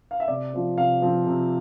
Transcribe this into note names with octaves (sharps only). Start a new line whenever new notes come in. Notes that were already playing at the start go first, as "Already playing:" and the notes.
F5
E5
C3 D5
F3 C4
C3 F5
F3 C4
C3